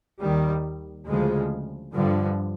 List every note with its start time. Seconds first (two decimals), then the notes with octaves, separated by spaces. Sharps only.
0.20 D#2 D#3 G3
1.07 D2 C#3 F3 G#3
1.94 G2 D3 F3